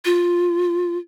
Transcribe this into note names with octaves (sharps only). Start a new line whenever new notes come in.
F4